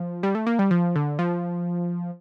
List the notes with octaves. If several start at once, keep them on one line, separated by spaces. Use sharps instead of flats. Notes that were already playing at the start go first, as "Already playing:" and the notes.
Already playing: F3
G3
A3
A#3
G3
F3
D3
F3